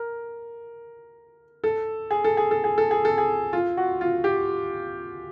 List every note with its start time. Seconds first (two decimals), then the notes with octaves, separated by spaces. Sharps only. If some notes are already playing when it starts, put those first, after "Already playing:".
Already playing: A#4
1.64 A4
2.11 G#4
2.24 A4
2.37 G#4
2.51 A4
2.64 G#4
2.78 A4
2.91 G#4
3.05 A4
3.18 G#4
3.53 F4
3.77 F#4
4.01 F4
4.24 G4